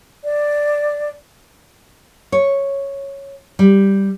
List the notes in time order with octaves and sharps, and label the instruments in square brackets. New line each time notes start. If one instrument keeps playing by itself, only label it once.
[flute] D5
[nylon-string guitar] C#5
G3